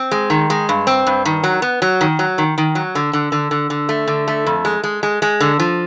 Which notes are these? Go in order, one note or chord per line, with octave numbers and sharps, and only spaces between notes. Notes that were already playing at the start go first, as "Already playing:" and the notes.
Already playing: C4
G#3
D#3
G#3
G2
C4
G2
D#3
F#3
B3
F#3
D#3
F#3
D#3
D#3
F#3
D3
D3
D3
D3
D3
A3
D3
A3
F2
G#3
G#3
G#3
G#3
D3
F3